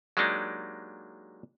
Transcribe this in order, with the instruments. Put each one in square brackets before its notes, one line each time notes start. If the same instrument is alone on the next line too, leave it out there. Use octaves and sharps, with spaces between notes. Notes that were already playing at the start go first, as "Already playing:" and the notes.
[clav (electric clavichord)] F#3 G#3 A#3 D4 D#4 G4